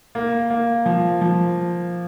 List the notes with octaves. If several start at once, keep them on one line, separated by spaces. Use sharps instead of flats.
A#3
A#3
F3
F3